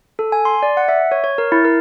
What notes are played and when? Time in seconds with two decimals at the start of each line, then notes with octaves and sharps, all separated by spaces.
0.19 A4
0.32 G#5
0.45 C6
0.63 D5
0.77 F#5
0.88 E5
1.12 C#5
1.24 C#5
1.38 A#4
1.52 E4
1.65 A#4